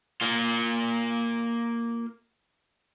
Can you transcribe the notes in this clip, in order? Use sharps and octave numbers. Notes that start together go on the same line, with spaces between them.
A#3 F4